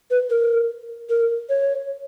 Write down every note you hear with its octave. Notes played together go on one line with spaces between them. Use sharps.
B4
A#4
A#4
C#5